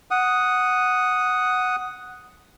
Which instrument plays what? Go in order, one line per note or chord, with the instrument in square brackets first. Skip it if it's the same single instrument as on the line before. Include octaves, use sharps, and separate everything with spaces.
[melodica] F#5 D#6